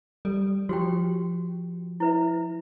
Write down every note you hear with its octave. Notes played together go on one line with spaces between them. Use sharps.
G3 A4
F3 F#4 G4 G5
E4 B4 E5